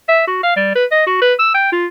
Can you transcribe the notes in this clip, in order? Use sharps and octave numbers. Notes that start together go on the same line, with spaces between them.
E5
F#4
F5
G3
B4
D#5
F#4
B4
E6
G5
F4